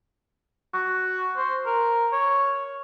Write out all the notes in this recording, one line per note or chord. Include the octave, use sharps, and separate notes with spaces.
F#4
C5
A#4
C#5